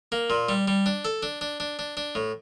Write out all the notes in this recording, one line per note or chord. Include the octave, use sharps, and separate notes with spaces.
A#3
A#2
G3
G3
D4
A4
D4
D4
D4
D4
D4
A2